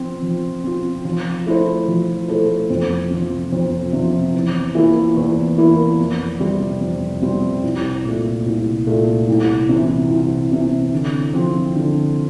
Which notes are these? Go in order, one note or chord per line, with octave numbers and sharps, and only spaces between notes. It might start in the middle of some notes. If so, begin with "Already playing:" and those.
Already playing: F3 C4 F4
F3
C4 F4
F3
A3 E4 A4 C5
F3
A3 E4 A4 C5
F2
C3 F3
F2
C3 F3
E2
E3 A#3 E4 A#4
E2
E3 A#3 E4 A#4
F2
C3 G3 C4
F2
C3 G3 C4
C2
A#2 A3
C2
A#2 A3
C2
C3 E3
C2
C3 E3
D3
F3 C4
D3